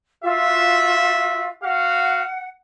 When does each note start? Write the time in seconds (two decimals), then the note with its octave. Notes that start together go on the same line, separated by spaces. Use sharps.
0.24 F4 F#4 E5
1.63 F#4 F5 F#5